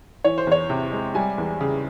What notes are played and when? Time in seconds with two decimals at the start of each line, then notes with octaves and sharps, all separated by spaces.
0.24 E3 C#5
0.38 C5
0.47 E2 C#5
0.70 C3
0.92 G#3
1.15 G3 G#5
1.38 E2
1.61 C#3